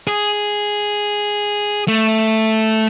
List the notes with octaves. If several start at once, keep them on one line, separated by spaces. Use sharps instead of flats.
G#4
A3